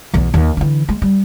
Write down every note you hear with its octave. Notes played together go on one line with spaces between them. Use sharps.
B1 E2
D#2
D3 E3
G#3
G3